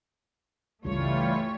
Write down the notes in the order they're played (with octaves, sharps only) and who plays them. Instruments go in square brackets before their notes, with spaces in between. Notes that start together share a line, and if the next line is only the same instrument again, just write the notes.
[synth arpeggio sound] C#2 G2 C#3 [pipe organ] E3 G3 F4 [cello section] A3 C#5